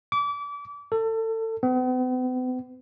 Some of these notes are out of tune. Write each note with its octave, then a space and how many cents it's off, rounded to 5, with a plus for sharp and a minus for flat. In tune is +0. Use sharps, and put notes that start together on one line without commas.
D6 -30
A4 +30
B3 +45